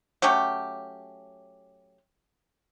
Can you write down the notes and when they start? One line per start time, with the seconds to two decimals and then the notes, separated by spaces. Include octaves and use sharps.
0.22 F#3 A3 C#4 G4